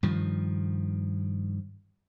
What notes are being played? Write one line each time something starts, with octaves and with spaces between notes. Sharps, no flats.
G2 D#3 F3